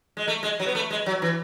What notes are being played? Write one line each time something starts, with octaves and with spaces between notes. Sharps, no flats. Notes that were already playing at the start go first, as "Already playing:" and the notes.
G#3
A3
G#3
F#3
B3
A3
G#3
F#3
E3